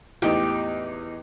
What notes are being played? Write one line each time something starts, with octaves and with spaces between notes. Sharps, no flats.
E2 A2 D#4 G4